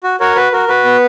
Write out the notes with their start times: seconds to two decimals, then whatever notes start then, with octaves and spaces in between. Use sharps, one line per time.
0.04 F#4
0.20 F#4 A#4 C#5
0.36 F#4 B4
0.52 F#4 A#4
0.68 F#4 B4
0.85 B3